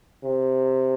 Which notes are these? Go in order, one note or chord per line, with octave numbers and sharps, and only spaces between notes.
C3